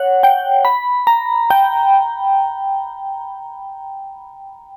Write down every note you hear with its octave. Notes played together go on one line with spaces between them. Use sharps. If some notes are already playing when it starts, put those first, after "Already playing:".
Already playing: C#5 F#5
G5
B5
A#5
G5